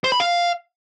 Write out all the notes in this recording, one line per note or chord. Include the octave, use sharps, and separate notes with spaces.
C5
B5
F5